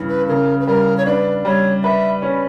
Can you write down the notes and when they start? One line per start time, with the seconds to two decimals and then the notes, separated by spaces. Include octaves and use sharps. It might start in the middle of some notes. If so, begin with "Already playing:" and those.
Already playing: G2 C#3 E3
0.09 B4
0.28 C#3 A#4
0.60 B4
0.67 G3 A#4
0.97 C#5
1.06 D4 B4
1.45 G3 C#5
1.83 B4 E5
2.22 C#4